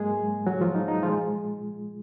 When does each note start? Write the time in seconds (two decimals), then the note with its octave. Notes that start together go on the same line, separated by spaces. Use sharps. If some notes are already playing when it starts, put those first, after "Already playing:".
Already playing: G#2 F#3 G#3 A#3 G#4
0.46 F#3 F#4
0.61 F3 F4
0.75 D#4
0.88 D#4
1.03 A#2 F3 G#3 F4